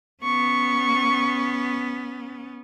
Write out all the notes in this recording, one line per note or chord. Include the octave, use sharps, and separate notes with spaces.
B3 C#4 C#6